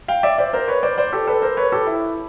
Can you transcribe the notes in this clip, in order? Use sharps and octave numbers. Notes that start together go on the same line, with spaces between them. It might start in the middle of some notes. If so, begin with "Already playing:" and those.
F5 G5
D5 E5
C5 D5
A#4 C5
B4 C#5
C5 D5
C5 D5
G4 A4
A4 B4
A#4 C5
B4 C#5
G4 A4
E4